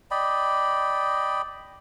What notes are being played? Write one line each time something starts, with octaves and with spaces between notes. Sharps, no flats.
D5 D#5 G5 B5